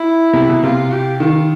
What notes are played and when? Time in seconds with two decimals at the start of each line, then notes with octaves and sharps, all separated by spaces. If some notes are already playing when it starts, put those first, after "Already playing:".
Already playing: E4
0.33 C3
0.49 B2
0.63 C3 F4
0.92 G4
1.20 D#3 F4